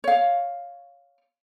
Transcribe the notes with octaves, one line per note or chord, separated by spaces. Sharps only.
C#5 F5